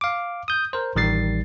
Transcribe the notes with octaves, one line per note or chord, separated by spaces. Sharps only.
F5 D6
D#6 G6
A#4 C5
A1 D#3 G3 A6 C7